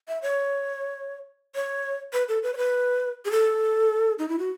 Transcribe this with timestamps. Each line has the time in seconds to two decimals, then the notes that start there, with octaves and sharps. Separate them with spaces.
0.08 E5
0.22 C#5
1.55 C#5
2.13 B4
2.29 A4
2.43 B4
2.54 C#5
2.57 B4
3.25 G#4
3.31 A4
4.19 D#4
4.29 E4
4.39 F#4